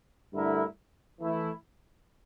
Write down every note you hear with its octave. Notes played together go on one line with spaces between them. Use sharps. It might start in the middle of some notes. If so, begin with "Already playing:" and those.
G2 D3 A3 E4 A#4
E3 A3 E4